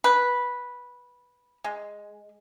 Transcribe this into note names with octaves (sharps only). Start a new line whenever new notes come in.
B4
G#3